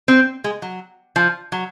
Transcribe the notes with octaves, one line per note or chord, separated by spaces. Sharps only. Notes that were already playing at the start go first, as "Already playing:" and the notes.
C4
G#3
F#3
F3
F#3